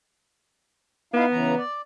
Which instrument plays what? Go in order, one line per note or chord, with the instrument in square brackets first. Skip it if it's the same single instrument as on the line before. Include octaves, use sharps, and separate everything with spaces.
[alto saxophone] B3 [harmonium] D#4 E4 F5
[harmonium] C#3 E3 A#5
D5